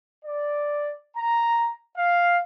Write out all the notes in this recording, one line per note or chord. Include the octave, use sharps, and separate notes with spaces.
D5
A#5
F5